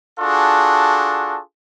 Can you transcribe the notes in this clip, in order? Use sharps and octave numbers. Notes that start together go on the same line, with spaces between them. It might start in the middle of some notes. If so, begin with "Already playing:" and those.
D4 F4 F#4 G#4 A4